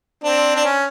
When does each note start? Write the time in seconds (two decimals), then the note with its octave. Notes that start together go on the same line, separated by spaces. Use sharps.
0.24 C4 D4
0.56 D4
0.64 C#4